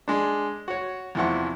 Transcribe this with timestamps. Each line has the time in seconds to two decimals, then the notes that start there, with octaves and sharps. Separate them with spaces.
0.08 G#3 D4
0.68 F#4 C#5
1.15 E2 C3 E3 F3 F#5 C#6